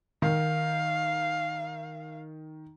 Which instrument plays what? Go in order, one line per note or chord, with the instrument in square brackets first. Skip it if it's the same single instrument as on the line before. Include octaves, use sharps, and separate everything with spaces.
[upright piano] D#3 [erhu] F5